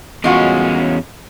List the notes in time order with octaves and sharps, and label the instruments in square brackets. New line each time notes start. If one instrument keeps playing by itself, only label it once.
[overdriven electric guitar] E2 C#4 [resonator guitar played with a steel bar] G#3 F4 F#4